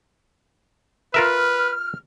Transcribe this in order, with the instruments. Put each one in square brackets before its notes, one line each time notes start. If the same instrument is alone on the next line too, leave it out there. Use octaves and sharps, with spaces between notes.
[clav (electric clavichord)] F4 A#4 E5 [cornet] B4 [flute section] F6